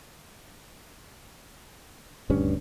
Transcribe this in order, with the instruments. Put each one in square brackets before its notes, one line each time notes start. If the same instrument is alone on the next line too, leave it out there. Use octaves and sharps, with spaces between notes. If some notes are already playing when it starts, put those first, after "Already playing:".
[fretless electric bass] D#1 D2 C#4 [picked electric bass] G2